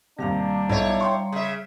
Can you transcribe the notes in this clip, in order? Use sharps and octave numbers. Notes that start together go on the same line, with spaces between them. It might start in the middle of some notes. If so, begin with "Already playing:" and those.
D#2 C3 G3 D4 F5 A#5
B1 E4 C#5
G5 C6 C#6
C#3 E5